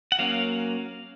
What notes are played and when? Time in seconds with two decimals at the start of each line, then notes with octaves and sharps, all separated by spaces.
0.12 F#5
0.19 F#3 A#3 C#4 F5